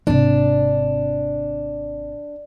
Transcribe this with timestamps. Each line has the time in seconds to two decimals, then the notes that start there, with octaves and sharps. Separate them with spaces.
0.07 G#1 C3 D4